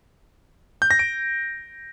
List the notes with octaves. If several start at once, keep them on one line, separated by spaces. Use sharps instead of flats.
G6
A#6
D7